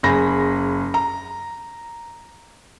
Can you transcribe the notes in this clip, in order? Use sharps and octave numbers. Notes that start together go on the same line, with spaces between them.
F#1 G#4 B5 A#6
A#5